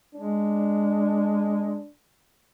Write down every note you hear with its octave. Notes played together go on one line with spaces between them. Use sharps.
G#3 D4